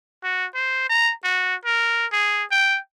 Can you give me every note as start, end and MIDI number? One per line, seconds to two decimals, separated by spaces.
0.24 0.45 66
0.55 0.88 72
0.90 1.13 82
1.24 1.55 66
1.66 2.06 70
2.13 2.44 68
2.51 2.79 79